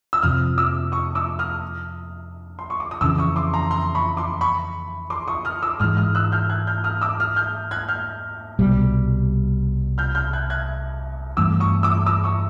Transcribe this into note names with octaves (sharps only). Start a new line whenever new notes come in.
E6
F2 C3 F3 D#6 F6
D6 E6
C#6 D#6
D6 E6
D#6 F6
C6
C#6
D6
D#6
F2 C#3 E3 D6 E6
C#6 D#6
C6 D6
A#5 C6
A#5 C6
B5 C#6
C6 D6
B5 C#6
C6 D6
C#6 D#6
D#6 F6
D6 E6
G#2 E3 G#3 D#6 F6
D#6 F6
E6 F#6
F6 G6
F#6 G#6
F6 G6
D#6 F6
D6 E6
D#6 F6
F6 G6
F#6 G#6
F6 G6
C2 B2 G3
F6 G6
F6 G6
F#6 G#6
F#6 G#6
G2 E3 A3 C4 D6 E6
C#6 D#6
D6 E6
D6 E6
C#6 D#6